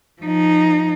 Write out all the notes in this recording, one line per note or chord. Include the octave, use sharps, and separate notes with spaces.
F3 D#4